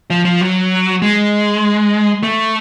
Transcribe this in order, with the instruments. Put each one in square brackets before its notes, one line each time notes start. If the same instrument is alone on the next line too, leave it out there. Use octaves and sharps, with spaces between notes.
[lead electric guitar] F3
F3
F#3
G#3
A3